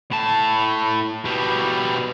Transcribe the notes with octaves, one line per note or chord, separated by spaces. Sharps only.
A2 A5
B2 G3